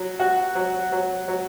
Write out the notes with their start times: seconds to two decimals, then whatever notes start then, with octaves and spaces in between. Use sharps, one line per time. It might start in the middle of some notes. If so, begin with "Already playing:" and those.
Already playing: F#3
0.19 F#4
0.55 F#3
0.92 F#3
1.28 F#3